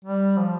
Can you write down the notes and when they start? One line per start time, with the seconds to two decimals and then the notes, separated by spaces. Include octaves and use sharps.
0.04 G3
0.37 F3